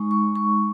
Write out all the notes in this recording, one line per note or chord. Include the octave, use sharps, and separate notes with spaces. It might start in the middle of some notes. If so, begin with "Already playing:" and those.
Already playing: G#3 D#4 C#6
C#6
C#6